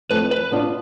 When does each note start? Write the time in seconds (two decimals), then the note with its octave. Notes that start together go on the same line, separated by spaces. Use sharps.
0.10 F2 E3 A3 B4
0.31 B4
0.51 B2 B3 D4 F4